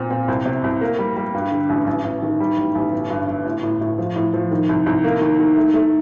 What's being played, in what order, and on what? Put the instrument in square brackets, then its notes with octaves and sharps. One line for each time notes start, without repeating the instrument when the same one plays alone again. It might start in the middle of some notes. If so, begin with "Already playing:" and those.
Already playing: [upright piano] A#2 C4
C4
C2
C3
C2
A#3
G3
G3
G2
D3
A1
A1
A1
D#3
G3
A1
A1
G1
G2
G1
A2
A2
A2
F3
A2
F3
D#3
C2
C2
A#3
D#3
D#3
A3
A3